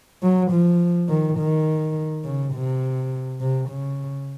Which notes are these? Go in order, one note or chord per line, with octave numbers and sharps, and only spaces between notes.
F#3
F3
D#3
D#3
C#3
C3
C3
C#3